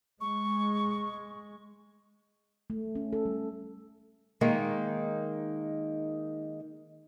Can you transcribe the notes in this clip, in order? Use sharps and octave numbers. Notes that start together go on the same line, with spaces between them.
G#3 C#6
A3
C#4
A4
G3
D#3 G#3 A#3 D#4